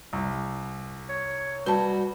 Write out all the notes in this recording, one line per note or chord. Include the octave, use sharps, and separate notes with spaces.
C2
C#5
G3 F#4 B4 A5